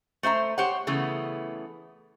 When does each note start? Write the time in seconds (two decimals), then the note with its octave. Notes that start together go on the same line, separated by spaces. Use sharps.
0.23 A3 C5 E5 A#5
0.58 G4 C5 C#5 F#5
0.87 C#3 E3 A3 B3